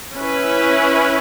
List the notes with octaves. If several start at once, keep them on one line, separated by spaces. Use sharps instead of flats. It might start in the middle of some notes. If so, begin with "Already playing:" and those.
C#4 E4 B4